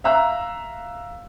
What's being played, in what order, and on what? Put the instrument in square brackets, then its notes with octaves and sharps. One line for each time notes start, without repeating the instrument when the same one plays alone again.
[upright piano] E5 F5 A#5 E6 F#6